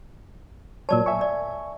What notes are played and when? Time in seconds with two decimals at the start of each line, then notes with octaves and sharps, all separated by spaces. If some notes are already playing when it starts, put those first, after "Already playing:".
0.89 A#2 F#3 A#4 C#5 D5 A5
1.06 E5 G#5 C#6
1.21 D5